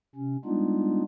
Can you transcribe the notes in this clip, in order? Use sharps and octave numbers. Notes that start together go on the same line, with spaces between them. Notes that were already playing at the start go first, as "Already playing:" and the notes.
C3 C#4
G3 G#3 B3 D4 D#4 F4